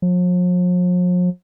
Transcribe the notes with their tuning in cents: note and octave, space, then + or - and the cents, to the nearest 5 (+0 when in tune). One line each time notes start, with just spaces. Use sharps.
F3 +45